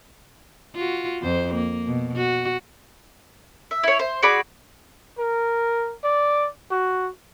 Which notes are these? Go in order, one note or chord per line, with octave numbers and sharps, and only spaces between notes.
F4 F#4
F2 C5
A#3
B2
F#4
E5
E4 C#5
C5
F#4 G#4 D5 B5
A#4
D5
F#4